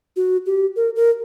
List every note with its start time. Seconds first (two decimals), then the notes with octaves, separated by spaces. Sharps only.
0.16 F#4
0.46 G4
0.76 A#4
0.96 A#4